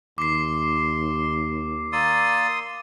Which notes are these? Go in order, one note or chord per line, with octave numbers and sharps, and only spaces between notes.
D#2 C6 D6 C7
A#3 D5 C6 D#6 E6